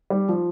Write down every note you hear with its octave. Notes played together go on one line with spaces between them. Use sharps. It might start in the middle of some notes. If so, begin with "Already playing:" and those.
G3
F3